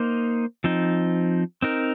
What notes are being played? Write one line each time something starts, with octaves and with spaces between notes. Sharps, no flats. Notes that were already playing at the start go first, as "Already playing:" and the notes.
Already playing: A#3 D#4 C5
F3 C4 D#4
C4 D#4 A#4